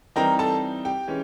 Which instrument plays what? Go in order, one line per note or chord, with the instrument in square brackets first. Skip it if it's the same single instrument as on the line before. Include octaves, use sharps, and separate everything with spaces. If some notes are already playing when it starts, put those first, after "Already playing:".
[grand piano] E3 G3 C4 D#4 A#4 A#5
A4 A5
G4 G5
E3 G#3 C#4